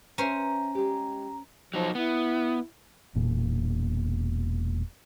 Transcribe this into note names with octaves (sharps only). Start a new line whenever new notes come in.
C#4 B4 C5 E5 A#5
G#3 G4
F3 F#3 D#4
B3 E4
E1 A#2